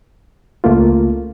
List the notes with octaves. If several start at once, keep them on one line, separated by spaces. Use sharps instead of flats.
C#2 A3 A#3 F4